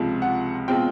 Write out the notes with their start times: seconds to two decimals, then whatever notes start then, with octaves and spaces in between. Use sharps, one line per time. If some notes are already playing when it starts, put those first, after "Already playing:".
Already playing: C#2 C3 F3 G#3
0.22 F#5
0.68 B2 G#3 C4 F4 G5